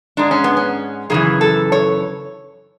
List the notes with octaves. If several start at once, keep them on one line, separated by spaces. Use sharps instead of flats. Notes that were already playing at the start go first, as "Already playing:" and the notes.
G#2 G#3 D4
C#4
B3
C#4
F#2 C#3 E3 G#4
A4
C#5